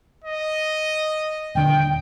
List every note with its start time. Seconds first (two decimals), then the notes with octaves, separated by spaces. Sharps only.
0.24 D#5
1.55 D#1 D3 D4 G5